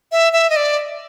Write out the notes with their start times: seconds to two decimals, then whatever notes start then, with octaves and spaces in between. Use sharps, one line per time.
0.12 E5
0.33 E5
0.50 D#5
0.56 D5